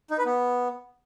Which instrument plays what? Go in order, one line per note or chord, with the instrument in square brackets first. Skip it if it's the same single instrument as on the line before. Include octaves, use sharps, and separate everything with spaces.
[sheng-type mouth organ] D#4
B4
B3